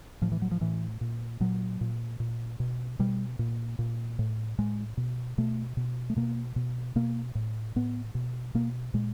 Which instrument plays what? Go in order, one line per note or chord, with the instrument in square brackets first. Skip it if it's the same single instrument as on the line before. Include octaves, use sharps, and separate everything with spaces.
[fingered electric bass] A2 F3
E3
F#3
F3
A2 E3
A#2
A#2 F#3
A#2
A#2
B2
B2 G3
A#2
A#2
A2
A2 G#3
B2
B2 A3
B2
A3
B2 A#3
B2
B2 A#3
A2
A2 B3
B2
B2 A#3
A#2 G#3